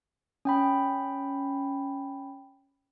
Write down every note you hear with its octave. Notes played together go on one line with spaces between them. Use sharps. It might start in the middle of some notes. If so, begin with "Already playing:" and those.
C#4 G5 B5